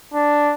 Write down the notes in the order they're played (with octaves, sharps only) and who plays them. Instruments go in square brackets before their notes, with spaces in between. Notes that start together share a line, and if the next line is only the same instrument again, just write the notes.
[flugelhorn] D4